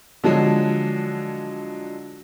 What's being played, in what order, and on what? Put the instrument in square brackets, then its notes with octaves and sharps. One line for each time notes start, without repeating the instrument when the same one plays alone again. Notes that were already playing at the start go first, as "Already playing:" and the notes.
[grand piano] D3 F3 F#3 G#3